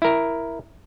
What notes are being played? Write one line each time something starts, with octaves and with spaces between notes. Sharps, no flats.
E4 A#4